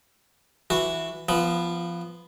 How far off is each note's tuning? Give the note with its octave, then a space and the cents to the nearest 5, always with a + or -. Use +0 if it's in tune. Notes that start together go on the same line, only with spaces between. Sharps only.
E3 +0 F#4 -15
F3 -20 B3 +0